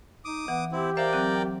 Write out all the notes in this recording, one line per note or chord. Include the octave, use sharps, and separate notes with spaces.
D#4 D6 D#6
E3 B3 F#5
C4 E4 G4
A#4 C5 D5 E5 F5 G5
F#3 C4 F#6